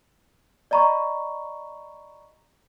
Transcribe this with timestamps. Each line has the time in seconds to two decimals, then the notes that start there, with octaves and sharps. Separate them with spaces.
0.71 D5 D#5 A#5 B5 C#6